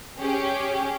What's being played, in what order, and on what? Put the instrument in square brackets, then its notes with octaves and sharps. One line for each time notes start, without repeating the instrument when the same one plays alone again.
[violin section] C#4 G4 G#4